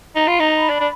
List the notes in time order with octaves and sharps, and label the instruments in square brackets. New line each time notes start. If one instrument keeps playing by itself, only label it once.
[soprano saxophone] D#4 [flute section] A#5
[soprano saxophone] F4 [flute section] B5
[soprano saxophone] D#4 [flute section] A#5
[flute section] B5
[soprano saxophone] D4
D4